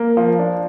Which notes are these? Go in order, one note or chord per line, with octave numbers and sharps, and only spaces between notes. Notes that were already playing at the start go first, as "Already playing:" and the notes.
Already playing: A#3
F3
D4